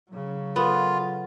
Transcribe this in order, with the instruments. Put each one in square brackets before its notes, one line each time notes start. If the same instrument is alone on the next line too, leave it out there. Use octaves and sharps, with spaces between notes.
[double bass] C#3 F#3
[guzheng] B3 [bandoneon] F4 [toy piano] A4 B5